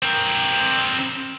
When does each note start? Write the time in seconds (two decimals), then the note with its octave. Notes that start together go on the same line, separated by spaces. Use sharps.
0.03 C4 A#4